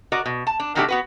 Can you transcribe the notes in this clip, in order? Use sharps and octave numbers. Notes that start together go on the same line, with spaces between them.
F#4 A#4 D5 D#5
B2
A5
D4
B2 D#3 F#3 A3 D4 G4
B3 F#4 B4